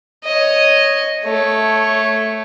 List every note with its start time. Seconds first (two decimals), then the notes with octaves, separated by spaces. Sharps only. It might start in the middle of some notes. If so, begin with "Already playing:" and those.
0.24 C#5 D#5
1.24 A3 C#5